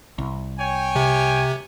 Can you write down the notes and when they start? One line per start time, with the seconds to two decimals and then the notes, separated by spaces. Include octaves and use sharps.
0.18 C2
0.58 C#5 G5 G#5
0.96 C3